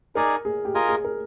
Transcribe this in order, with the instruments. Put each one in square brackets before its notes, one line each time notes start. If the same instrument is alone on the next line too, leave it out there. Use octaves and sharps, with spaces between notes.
[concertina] D#4 G#4 D5 G#5 [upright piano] A#4
[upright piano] G#4
G4
[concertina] F4 A#4 D#5 G#5 [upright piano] G#4
[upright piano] G#4
A#4